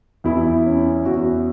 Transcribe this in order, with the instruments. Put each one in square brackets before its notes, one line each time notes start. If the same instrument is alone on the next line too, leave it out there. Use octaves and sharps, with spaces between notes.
[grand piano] E2 [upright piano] E4
[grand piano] C#4
[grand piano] E2 [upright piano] F#4